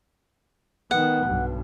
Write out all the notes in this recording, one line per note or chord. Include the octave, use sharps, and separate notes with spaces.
D#3 B3 F#5
B1 G2